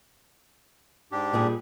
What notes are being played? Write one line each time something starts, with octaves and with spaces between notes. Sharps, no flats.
G#2 D4 G4
A#2 G3 G#4